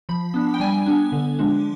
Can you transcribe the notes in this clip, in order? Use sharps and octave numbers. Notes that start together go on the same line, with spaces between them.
F3 B5
B3 D4
G5
G3 G#5
B3 D4
D3
F3 G#3 D4